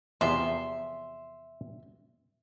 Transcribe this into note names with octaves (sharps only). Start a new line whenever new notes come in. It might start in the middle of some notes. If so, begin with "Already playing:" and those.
E2 C3 F3 E5 C6